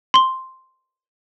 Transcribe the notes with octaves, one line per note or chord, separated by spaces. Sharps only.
C6 G7